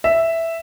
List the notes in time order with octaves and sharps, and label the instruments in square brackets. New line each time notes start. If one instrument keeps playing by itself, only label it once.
[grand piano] E5